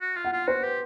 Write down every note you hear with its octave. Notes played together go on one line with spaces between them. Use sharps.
F#4
F4
F#5
F4
F#4 C5
B4
G4